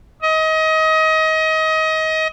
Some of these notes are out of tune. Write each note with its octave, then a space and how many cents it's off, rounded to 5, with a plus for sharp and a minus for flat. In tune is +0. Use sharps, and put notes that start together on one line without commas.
D#5 +25